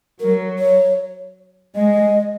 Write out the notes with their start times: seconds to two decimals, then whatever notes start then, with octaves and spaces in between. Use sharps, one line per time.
0.20 F#3 A#4
0.59 C#5
1.75 G#3 D#5